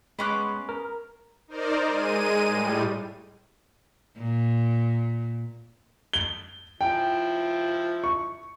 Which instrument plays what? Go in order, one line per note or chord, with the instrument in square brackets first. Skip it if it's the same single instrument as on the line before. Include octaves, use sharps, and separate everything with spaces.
[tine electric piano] G#3 C6 F#6 [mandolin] B3 C#4 D6
[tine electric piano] A#4
[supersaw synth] D#4 A#4 C5 D5
G#3 D#7
A2 G3
[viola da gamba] A#2
[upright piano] G7
[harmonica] F3 E4 [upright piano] G5
[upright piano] C#6